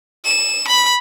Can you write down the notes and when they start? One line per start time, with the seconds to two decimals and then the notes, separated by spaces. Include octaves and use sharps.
0.25 E7
0.68 B5